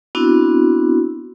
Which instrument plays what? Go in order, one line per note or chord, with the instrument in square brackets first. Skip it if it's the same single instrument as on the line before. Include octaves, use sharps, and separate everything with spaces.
[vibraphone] B3 C4 D4 E4 F#4